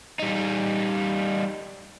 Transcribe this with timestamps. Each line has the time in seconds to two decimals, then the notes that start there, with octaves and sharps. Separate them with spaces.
0.19 G3 D#4